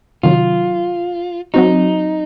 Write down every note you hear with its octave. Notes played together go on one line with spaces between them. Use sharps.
C3 D#3 F#3 F4
F#3 C4 D#4 F#4